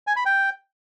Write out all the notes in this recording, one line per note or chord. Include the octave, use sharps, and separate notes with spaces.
G#5
B5
G5